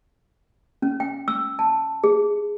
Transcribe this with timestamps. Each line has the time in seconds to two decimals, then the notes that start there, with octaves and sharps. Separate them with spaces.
0.82 C#4
1.00 G5
1.28 E6
1.59 A5
2.04 G#4